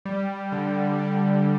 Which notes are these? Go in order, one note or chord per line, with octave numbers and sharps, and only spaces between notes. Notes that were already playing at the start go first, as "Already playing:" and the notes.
G3
D3
G3